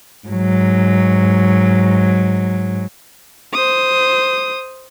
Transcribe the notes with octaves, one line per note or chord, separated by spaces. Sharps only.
G#2 F#3
C5 D#6